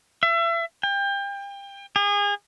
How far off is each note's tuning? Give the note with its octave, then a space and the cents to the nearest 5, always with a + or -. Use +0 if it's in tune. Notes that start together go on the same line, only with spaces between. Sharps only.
E5 +35
G5 +30
G#4 -30